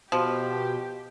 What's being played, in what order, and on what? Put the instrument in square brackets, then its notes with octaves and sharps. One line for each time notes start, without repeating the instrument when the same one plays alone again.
[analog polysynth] B2 [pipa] F3 [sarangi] G4